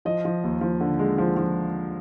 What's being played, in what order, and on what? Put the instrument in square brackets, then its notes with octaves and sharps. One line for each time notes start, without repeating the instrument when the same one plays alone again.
[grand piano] F3 D#5
F3
D#2
F3
D3
G#3
F3
F3